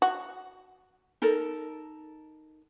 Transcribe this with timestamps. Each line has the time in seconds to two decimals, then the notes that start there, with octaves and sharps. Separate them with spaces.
0.02 F#4
1.22 D#4 A4 A#4